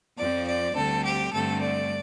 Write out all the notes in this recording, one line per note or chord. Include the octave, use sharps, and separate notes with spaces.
F2 F3 C4 D5
D5
D2 D3 G3 C4 A4
G4
G2 D3 A3 C4 A4
D5